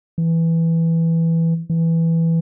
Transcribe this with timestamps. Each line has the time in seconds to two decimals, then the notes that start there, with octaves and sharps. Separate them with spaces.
0.18 E3
1.70 E3